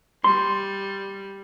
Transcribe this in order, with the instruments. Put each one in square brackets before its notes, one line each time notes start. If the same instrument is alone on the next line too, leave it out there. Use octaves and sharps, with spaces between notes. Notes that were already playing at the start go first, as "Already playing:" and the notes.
[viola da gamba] G3 [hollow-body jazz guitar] C6